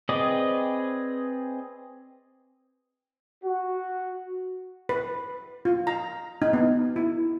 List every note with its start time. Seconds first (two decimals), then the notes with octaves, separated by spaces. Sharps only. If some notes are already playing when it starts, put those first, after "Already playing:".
0.09 C4 G#4 B4 D5 D#5
3.44 F#4
4.89 B4
5.65 F4
5.87 A#5
6.42 D#4
6.53 B3
6.96 E4